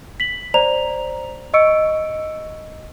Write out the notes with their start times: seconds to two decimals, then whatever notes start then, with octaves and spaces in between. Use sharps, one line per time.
0.20 B6 F#7
0.54 C5 D5 A#5 F7
1.54 D#5 C#6 E6 C#7 D7